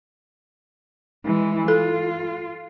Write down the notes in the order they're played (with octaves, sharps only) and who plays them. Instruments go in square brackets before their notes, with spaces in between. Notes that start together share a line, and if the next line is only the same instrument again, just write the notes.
[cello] E3 G#3
[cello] F4 [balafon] A4